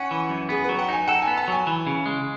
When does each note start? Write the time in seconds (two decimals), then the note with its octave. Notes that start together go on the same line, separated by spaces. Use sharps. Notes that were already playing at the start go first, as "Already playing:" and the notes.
Already playing: C#4 F#5
0.11 E3
0.29 F#2
0.49 B3 G#4
0.64 F#3 B4
0.79 F#5
0.89 D#4 G#5
1.08 A4 F#5
1.22 G#5
1.27 B3
1.37 A5
1.48 F#3 G#5
1.67 E3
1.87 C#3
2.06 G#3